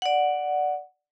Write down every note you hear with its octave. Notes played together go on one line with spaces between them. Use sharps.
D5 F#5